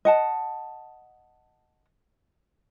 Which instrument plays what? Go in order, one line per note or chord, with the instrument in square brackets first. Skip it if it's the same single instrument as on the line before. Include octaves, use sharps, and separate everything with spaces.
[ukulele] D#5 F#5 A5